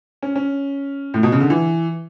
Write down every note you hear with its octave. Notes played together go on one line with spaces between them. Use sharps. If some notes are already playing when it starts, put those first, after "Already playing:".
C#4
C#4
A2
B2
C#3
D3
E3